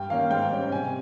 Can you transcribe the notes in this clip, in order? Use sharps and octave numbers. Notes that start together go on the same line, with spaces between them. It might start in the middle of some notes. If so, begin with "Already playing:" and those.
Already playing: G2 G5
D#3 A#3 C#4 F5
G#2 G5
G3 C#4
C3 G#5